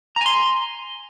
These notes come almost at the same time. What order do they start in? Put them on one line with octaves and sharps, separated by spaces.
A#5 G#5 C6